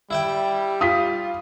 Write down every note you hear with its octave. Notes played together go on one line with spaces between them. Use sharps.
G3 E4 E5 G5
F4 D#6 B6